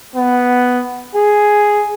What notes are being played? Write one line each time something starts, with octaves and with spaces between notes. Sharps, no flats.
B3
G#4